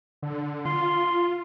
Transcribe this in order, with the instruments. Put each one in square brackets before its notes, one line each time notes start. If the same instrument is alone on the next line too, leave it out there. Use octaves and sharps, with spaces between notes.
[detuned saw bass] D3
[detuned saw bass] F4 [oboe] C6